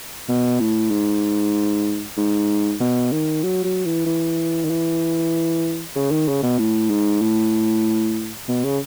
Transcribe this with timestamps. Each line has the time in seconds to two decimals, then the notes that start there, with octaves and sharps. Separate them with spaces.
0.29 B2
0.60 A2
0.91 G#2
2.17 G#2
2.80 B2
3.12 D#3
3.43 F#3
3.64 F#3
3.85 E3
4.06 E3
4.64 D#3
4.70 E3
5.95 C#3
6.11 D#3
6.28 C#3
6.43 B2
6.58 A2
6.90 G#2
7.21 A2
8.48 B2
8.64 C#3